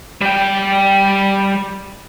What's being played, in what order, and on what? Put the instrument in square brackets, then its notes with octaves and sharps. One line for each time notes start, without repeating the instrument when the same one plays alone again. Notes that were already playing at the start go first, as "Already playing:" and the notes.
[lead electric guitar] G3 G5